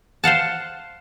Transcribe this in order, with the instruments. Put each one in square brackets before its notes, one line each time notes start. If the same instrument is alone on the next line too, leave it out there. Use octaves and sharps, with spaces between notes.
[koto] C5 F5 F#5 A5